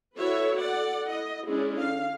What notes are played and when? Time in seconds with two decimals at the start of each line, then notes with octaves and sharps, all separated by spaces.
0.17 E4 F#4 A4 B4 C#5 E5
0.60 A4 D5 F#5
1.09 E4 D#5
1.48 G#3 C#4 D4 E4 G#4
1.79 D3 F5